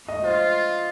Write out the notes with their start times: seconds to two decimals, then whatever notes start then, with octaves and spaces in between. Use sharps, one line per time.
0.08 D#5
0.24 F4 C5